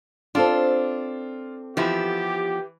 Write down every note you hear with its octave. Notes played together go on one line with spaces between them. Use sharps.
C4 D4 F4 A4 C5
E3 F3 B3 E4 G4